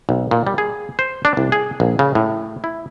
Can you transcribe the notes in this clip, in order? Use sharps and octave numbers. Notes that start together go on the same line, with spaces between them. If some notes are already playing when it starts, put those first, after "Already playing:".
B1
A#2
G3
G#4
C5
D4
C2
G#4
A#1
C#3
A2
E4